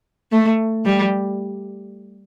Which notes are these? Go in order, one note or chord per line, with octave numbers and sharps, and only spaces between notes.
A3
G3